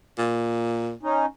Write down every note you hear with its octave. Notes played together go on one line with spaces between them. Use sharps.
A#2
C#4 D#4